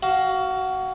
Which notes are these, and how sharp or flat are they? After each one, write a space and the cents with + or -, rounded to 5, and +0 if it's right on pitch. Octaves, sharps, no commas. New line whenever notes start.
F#4 +20 F5 +0